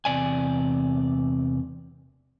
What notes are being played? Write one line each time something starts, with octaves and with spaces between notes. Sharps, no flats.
E2 C3 D5 G#5